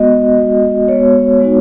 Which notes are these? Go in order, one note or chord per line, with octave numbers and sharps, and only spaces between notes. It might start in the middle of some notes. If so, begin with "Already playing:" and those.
Already playing: G#3 B3 F#4 D#5
G#3 B3 F#4
G#3 B3 F#4 C#5
G#3 B3 D#4 F#4